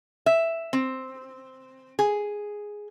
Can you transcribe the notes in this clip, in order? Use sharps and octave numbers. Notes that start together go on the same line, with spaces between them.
E5
C4
G#4